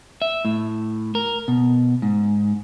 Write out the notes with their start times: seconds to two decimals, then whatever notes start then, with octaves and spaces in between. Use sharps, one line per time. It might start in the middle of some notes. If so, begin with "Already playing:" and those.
0.22 E5
0.45 A2
1.15 A#4
1.48 B2
2.02 G#2